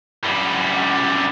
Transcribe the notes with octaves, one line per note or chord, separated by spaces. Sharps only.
F#2 G3